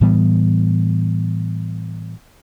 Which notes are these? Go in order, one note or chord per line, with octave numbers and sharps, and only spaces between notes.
A2 E3 G3 B3